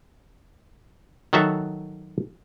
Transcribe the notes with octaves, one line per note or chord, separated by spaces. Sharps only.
D#3 F#3 F#4 A4 E5 F5